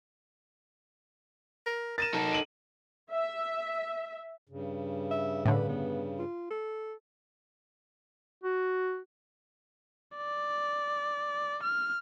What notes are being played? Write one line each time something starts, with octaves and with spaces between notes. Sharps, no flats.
A#4
A#4 A6 D#7 E7
D#4 A4
D7 D#7 F#7
E5
G2 C#3
E5
A2 D3 B4
B3
F4
A4
F#4
D5
F6